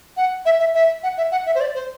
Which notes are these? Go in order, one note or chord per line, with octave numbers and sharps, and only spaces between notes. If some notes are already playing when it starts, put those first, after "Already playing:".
F#5
E5
E5
E5
F#5
E5
F#5
E5
C5
D5
C5